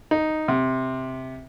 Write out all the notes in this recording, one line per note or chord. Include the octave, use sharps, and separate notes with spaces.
D#4
C3